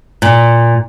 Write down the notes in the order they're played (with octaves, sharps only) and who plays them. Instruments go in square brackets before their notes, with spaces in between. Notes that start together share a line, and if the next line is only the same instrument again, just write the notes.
[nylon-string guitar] A#2